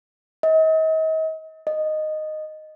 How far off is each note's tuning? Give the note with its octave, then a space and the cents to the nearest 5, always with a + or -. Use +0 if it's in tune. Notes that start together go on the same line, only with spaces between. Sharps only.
D#5 +40
D#5 -10